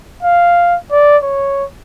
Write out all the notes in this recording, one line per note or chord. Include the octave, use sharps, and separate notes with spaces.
F5
D5
C#5